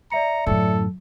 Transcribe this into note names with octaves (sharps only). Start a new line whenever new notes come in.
D5 E5 A#5 C#7
F#2 A2 D3 A4